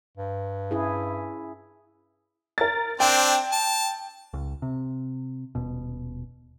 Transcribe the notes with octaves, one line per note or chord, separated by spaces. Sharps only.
G2
C#4 E4 G#4
A#4 A6
C4 D4 G5
A5
C#2
C3
D#1 B2